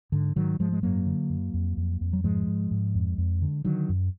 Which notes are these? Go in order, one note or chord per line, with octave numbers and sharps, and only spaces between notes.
G#2 D3
G#2 D#3 F#3
G#2 F3 G#3
G#3
F#2 F#3 A#3
D3
F#2
F2
F2
F2
F#3
G#2 F3 G#3
G#2
G#2
F2
F2
D3
D3 D#3 F#3
F#2